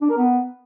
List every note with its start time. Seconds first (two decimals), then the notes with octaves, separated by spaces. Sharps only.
0.01 D4
0.10 A#4
0.18 B3